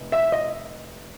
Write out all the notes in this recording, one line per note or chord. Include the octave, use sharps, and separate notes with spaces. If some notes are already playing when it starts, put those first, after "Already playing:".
Already playing: F1
E5
D#5